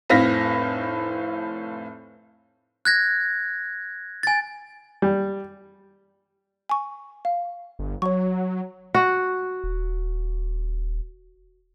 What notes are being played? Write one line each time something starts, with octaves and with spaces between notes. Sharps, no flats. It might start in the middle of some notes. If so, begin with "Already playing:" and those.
F1 A2 C4 F5 A#6 B6
F#6 G#6 A#6
G#5 A6
G3
G#5 C#6
F5
G1
F#3 C#5 C#6
F#4
D#1